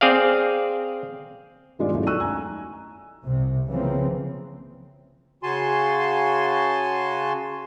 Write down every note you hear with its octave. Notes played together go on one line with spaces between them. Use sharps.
C4 G#4 D5 F5
G2 D#3 G#3 F4 D5
F#3 A3 C#4 E4
D#4 C#6 E6 F#6 D#7
G#5 A#5
C2 C3
C#3 E3 F3 A#3 C4
C#3 F#4 G#5 A5 C6